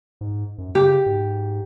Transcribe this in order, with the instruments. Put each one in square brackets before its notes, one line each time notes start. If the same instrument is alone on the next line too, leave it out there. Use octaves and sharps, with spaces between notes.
[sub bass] G#2
F#2
[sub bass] C#3 [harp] G4
[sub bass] G#2